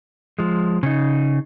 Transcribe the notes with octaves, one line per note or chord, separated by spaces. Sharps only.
F3 G#3
C#3 D#4